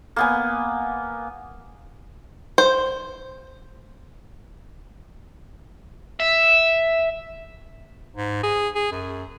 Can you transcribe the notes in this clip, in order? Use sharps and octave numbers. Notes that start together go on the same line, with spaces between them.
A#3 B3 G#5
C5
E5
G#2
G#4
G#4
F#2